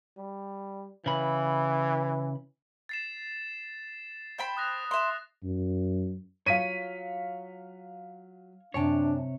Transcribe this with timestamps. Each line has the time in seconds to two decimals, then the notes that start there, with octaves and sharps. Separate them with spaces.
0.17 G3
1.06 C#3 E3 B5
2.89 A6 C7 E7
4.38 C5 G5 B5
4.57 D#6 F#6 A#6
4.91 E5 C6
5.43 F#2
6.46 F#3 F4 C#5 F5 B6 D#7
8.74 F#2 C3 D4 C#5 G5 A5